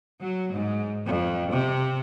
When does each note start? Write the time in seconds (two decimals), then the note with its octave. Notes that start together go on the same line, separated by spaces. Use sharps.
0.21 F#3
0.55 G#2
1.07 F2
1.52 C3